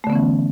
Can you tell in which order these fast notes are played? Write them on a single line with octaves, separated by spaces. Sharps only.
A3 D3 B3 C#4 E3